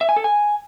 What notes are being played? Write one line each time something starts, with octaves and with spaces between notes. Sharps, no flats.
E5
G#5
A4
G#5